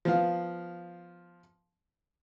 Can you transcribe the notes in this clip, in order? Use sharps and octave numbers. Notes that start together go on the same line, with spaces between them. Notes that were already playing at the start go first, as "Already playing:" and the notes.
F3 B3 F5